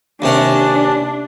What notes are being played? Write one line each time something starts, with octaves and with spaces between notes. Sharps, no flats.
D#2 C3 C#4 D4